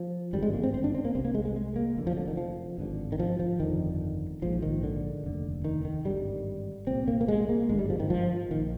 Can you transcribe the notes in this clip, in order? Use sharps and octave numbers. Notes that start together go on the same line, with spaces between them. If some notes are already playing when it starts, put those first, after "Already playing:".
Already playing: F3
G#1 G2 D3 G3
G#3
A#3
C4
C4
D4
C4
A#3
C2 C3 C4
A#3
G#3
G#3
G#3
A#3
F1 F2 D3
F3
D3
D#3
F3
G#1 G2 D3
D#3
F3
F3
G1 F2 D3 D#3
A#1 G#2 F3
D#3
D3
F1 D#2 D3
D#3
D#3
G#1 G2 D3 G3
C2 A#2 C4
A#3
A#3
G#3
A#3
G#1 G2 D3 G#3
G3
F3
D#3
F3
A#1 D#3